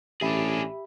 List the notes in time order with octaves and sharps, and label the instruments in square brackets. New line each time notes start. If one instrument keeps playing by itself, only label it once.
[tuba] A1 [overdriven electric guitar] D4 G#4 [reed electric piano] G4 E5 B5